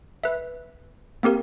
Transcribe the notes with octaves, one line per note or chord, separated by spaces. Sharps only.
B4 E5
A#3 C4 G4 A#4